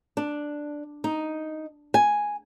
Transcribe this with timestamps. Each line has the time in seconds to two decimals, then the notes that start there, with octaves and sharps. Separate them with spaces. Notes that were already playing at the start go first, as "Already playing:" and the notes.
0.17 D4
1.04 D#4
1.94 G#5